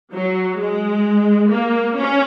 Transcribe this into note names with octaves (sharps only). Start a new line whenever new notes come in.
F#3
G#3
A#3
C#4